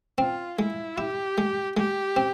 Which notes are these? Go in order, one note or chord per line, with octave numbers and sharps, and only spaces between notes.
C4 F4
G#3 E4
E4 G4
G#3
G#3 G4
C4